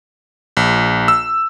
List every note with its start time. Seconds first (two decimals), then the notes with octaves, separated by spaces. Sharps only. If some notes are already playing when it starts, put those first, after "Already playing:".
0.57 A#1
1.08 E6